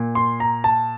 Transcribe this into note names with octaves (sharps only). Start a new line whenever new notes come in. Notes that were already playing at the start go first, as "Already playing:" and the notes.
Already playing: A#2
C6
A#5
A5